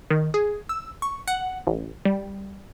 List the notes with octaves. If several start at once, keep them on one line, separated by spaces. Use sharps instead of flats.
D#3
G#4
E6
C#6
F#5
A1
G3